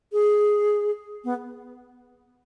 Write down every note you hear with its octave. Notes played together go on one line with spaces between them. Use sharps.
G#4
B3